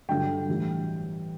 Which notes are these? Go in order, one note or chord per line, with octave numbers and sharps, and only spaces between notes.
G2 D3 F#3 G5
A2 E3 G3